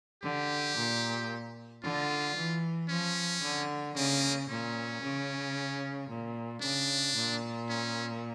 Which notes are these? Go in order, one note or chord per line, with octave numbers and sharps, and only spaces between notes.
D3 G4
A#2
D3 F4
E3
F3 C#4
D3
C#3 A#3
A#2 C#4
C#3
A#2
C#3 D4
A#2
C#4